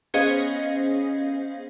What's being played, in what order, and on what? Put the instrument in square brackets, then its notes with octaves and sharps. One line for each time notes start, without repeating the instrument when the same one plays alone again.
[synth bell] B3 C#4 G#4 C5 D#5 F5